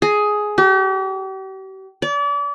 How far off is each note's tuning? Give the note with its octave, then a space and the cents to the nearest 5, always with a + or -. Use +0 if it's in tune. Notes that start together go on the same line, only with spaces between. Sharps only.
G#4 +10
G4 -40
D5 -35